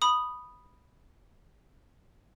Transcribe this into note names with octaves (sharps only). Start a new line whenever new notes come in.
B5 D#6